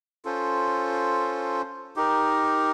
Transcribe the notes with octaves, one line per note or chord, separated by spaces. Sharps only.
C#4 F4 A4 C5
D#4 G4 A#4